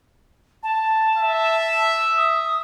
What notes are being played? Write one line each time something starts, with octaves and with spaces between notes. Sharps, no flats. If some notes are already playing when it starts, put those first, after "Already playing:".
A5
E5
D#6